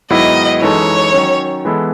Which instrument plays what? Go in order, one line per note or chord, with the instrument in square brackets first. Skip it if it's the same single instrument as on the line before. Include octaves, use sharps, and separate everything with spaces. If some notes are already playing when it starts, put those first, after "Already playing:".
[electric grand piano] G#2 D#3 F#3 B3 E4 [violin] D#5
[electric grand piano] F#2 E3 G#3 D#4 A4 [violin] C#5
[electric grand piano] D#3 F#3 C#4
E3 G#3 B3 E4 A4